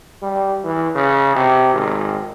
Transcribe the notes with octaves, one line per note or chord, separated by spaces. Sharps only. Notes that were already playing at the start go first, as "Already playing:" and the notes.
G3
E3
C#3
C3
G#1